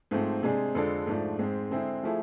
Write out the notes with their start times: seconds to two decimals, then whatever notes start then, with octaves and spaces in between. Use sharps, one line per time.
0.11 G#2 F3 A3 C4
0.43 C3 G#3 D4 G#4
0.75 F2 D3 G#3 D4 A4
1.07 G#2 F3 A3 D4
1.39 G#2 G#3 C4
1.71 D3 G#3 C4 E4 G#4
2.03 F3 A3 E4 G#4